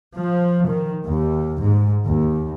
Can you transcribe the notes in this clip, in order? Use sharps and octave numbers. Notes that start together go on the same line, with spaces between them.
F3
D#3
D#2
G#2
D#2